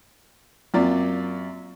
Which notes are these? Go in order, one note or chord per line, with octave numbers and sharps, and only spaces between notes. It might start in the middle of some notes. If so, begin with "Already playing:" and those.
F#2 A#3 C4 F4 D5